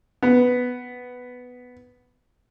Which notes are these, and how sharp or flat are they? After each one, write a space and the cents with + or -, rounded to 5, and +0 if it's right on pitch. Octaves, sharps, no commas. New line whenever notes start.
B3 +5